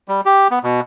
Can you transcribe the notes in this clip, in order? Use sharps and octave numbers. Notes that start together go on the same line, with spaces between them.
G3
G4
B3
B2